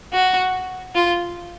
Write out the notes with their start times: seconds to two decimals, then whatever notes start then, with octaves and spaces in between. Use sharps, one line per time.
0.13 F#4
0.95 F4